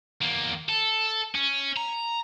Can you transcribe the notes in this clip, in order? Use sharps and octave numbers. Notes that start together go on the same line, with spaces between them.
E2 A#3
A4
C#4
A#5